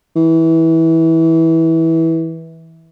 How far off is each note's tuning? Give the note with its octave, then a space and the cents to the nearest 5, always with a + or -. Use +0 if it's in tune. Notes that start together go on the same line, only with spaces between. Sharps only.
E3 -20